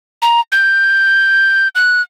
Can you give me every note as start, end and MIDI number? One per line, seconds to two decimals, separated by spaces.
0.22 0.40 82
0.52 1.68 91
1.75 2.02 90